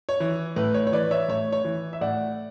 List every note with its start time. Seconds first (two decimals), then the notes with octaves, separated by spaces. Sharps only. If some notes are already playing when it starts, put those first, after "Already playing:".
0.09 C#5
0.20 E3
0.56 A2 B4
0.74 C#5
0.87 C#5
0.92 E3 B4 D5
1.11 C#5 E5
1.28 A2 C#5
1.52 C#5
1.65 E3
1.93 E5
2.01 A2 D5 F#5